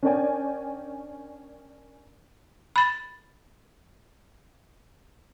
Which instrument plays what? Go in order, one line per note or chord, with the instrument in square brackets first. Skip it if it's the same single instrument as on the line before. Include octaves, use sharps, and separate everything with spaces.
[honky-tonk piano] C#4 D4 A#4 D5 G5 G#5
[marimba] B5 A6